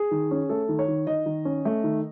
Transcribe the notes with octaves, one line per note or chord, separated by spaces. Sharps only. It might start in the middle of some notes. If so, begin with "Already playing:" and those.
Already playing: G#4
D#3
C#4
A3 A4
D#3
C#5
D#3
D#3 D#5
D#3
C#4
A3
D#3